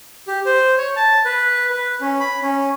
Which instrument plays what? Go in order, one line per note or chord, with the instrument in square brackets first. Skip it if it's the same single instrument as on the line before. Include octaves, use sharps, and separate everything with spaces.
[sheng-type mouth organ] G4
C5
C#5
A5
B4
B4
C#4
B5
C#4